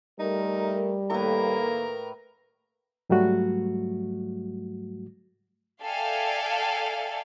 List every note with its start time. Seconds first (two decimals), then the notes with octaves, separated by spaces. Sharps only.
0.20 G3 A3 D#4 A#4
1.10 A2 D#3 A3 A#3 A#4 B4
3.10 G#2 F#3 G3 A3 F#4
5.83 A4 D5 E5 F5 G5 G#5